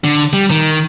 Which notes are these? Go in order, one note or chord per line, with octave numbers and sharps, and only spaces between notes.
D3
G3
D#3